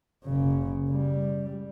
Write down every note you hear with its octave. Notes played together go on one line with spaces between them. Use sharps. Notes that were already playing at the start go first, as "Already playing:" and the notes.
F#1 C#3
G3